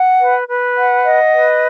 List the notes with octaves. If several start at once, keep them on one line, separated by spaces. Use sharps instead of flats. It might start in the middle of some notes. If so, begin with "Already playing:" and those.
Already playing: F#5
B4
B4
F#5
D#5
B4